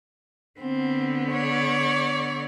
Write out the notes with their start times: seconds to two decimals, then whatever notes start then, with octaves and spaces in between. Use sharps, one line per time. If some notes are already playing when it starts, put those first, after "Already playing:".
0.60 D3 B3 C4
1.31 C#5 D5